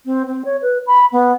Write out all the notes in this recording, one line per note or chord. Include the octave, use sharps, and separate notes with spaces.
C4
C4
C#5
B4
B5
B3